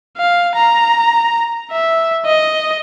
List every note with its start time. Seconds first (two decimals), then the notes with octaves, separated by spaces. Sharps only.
0.17 F5
0.56 A#5
1.72 E5
2.26 D#5